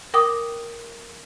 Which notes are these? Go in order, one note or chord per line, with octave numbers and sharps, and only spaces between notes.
A#4 G5 D6 D#6